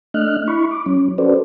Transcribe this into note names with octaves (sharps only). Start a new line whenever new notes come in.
A3 D4 D#5 F6 F#6
E4 B5 C#6
D6
F#3 C#4
C#4 F#4 A4 B4 C5 D5